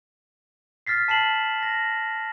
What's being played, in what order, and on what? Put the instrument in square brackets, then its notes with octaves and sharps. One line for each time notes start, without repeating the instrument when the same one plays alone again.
[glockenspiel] F6 A6 B6 C7
A5 C7 E7 F#7
A#6